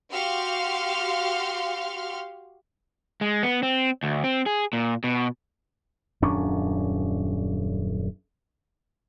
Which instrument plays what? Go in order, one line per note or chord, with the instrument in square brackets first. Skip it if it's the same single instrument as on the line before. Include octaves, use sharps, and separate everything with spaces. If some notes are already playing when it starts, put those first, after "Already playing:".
[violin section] F#4 G4 F5 C6 F6
[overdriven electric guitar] G#3
B3
C4
D2
C4
G#4
A#2
B2
[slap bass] D#1 F#2 C#4 D4